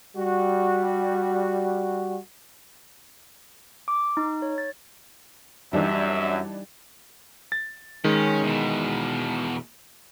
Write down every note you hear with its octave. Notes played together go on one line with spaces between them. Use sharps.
G3 F#4
D6
D#4
C#5
A6
F#2 E3 G3 D4 D#4 E5
A6
D#3 G#3 C#4
E2 B2